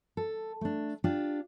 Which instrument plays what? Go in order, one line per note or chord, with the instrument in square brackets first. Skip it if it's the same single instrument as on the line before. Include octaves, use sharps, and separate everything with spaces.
[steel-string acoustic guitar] A4
A3 D4
D4 F4 G4